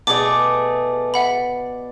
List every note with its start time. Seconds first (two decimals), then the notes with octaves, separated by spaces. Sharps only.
0.07 B2 A3 G#4 D5 D6
1.14 E5 F#5 B5